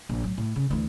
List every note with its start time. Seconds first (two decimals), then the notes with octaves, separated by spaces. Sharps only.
0.09 A#1
0.23 A2 F#3
0.38 A2
0.56 C#3
0.70 D2 E3